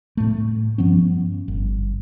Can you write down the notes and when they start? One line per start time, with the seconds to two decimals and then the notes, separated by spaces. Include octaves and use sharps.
0.17 A2 A3
0.78 G2 F3 B3 C#4
1.48 G1